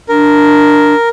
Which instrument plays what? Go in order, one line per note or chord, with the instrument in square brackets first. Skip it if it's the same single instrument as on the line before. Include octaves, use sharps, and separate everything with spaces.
[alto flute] D4 [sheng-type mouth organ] A#4